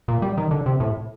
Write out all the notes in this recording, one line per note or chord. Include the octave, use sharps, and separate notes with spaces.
A#2
G3
D#3
D3
C3
A2